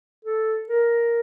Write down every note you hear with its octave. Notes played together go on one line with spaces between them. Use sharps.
A4
A#4